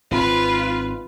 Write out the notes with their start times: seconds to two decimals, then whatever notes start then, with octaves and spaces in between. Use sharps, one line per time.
0.11 G#1 C4 F4 B4